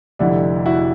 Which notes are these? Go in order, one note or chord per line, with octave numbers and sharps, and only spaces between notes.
F1 F2 D3 G3 D4 E4
E4 F#4